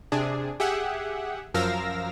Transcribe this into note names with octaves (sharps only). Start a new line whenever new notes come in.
C3 D4 G#4
G4 G#4 E5 F#5
F#2 F3 A#4 F5 E6 A#6